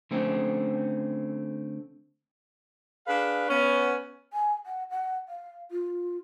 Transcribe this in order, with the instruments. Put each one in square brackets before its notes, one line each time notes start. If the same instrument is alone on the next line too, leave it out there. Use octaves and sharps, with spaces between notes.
[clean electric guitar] D3 A3 C4 C#4
[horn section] D4 G#4 B4 F5
B3 C#4
[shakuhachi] G#5
F#5
F#5
F5
F4